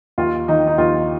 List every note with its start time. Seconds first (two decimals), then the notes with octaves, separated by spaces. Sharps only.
0.18 D#2 F4
0.48 D#3 D#4
0.67 D#4
0.78 D#2 F4